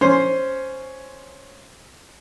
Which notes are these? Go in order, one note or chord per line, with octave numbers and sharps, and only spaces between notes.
C#4 C5